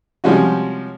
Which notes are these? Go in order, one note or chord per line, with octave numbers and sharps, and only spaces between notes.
C3 F3 G3 G#3 C#4 F#4